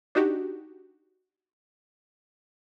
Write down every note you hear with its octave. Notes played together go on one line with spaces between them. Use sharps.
D4 D#4 F#4 G4